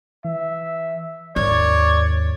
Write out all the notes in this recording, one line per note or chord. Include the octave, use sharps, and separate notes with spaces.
E3 E5
D#2 G#2 C#5 D5